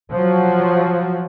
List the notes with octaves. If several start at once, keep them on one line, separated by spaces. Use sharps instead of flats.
F3 F#3